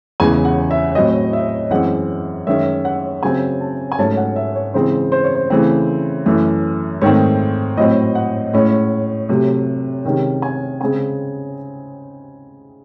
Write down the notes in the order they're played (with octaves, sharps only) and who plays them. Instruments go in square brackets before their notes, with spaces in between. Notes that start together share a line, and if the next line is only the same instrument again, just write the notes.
[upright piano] E2 C#3 E3 G#3 G#5
F#5
E5
A2 F#3 C4 D#5
E5
F#2 E3 G#3 C4 F#5
F#2 D#3 G#3 C#4 E5
F#5
C#3 F#3 C4 G#5
A5
G#5
G#2 F#3 A3 C#4 A5
F#5
E5
C#5
C#3 E3 G#3 C4 C5
C5
C#5
C5
C#3 E3 A3 C4
F#2 E3 A3
G#2 D#3 A3 C4 C#5
A2 F#3 C4 D#5
F#5
A2 G#3 C#4
C3 F#3 A3
C3 D#3 G#3 C#4
G#5
C#3 G#3 C4 G#5